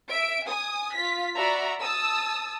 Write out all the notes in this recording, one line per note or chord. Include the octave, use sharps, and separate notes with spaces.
E5 D7
G#5 D#6
F4 B6
F#4 D5 E5 A#5 B5
A5 D#6 E6